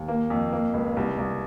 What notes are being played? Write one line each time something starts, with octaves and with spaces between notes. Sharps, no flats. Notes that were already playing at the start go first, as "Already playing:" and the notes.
Already playing: D#2
A#3
F2
A#3
C#2
C2
C2